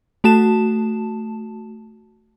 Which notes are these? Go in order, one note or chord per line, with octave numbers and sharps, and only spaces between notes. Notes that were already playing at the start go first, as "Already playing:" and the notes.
A3 F#4 A5 E7